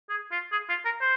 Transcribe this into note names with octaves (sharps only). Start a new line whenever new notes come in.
G#4
F4
G#4
F4
A#4
C5